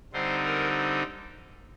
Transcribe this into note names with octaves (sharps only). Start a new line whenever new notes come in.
D3 G3 C4 D#4 C5
A#4